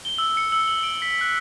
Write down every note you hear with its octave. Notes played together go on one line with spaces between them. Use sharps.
G7
E6
C#7
E6
F#7
D7
B6
F#6